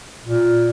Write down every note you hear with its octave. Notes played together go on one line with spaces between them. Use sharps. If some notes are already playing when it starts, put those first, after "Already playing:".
A#2